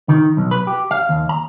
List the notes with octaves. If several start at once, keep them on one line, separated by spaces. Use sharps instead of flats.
D#3
B1
B4
G4
F5
D#2
A#5